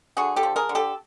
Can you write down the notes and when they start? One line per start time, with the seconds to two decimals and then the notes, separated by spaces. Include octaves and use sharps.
0.17 D3 F#4 G#4
0.36 G4 A4
0.43 F3
0.56 G#4 A#4
0.69 D3
0.75 G4 A4